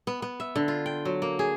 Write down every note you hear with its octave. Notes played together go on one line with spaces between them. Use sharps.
B3
B3
E5
D3
F4
G5
F#3
A#3
G#4